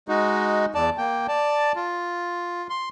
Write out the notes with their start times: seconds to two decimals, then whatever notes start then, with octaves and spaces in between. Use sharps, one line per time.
0.09 G#3 D#4 F#4
0.75 E2 D5 A5
0.98 A#3 G5
1.28 D5 A5
1.76 F4
2.70 C6